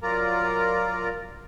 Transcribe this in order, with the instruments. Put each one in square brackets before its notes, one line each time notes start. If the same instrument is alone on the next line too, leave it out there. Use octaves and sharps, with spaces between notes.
[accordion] F#3 F4 A#4 D5 A#5